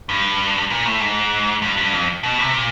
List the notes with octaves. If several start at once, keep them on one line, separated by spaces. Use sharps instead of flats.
G2
A#2
A2
G#2
G2
G2
F2
B2
C3
A#2